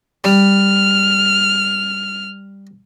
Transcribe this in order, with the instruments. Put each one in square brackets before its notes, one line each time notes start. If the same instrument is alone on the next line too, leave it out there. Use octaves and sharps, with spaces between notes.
[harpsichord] G3 [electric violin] F6